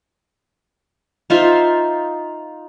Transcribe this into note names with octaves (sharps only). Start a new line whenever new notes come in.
D#4 F4 C5 E5